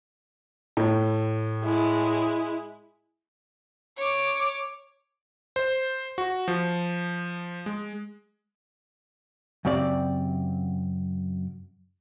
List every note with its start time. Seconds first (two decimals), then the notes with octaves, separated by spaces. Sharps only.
0.77 A2
1.64 G#3 E4
3.97 C#5 D6
5.56 C5
6.18 F#4
6.48 F3
7.66 G#3
9.65 F#2 C#3 C4 G4 D5